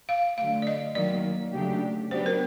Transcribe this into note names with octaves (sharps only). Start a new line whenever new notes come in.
F5
D3 F#3 A3 F5
D5
D#5
D#3 F#3 A#3 D5
C#3 F#3 A3 D4 G4
F#3 B3 D4 G4 C5
A#4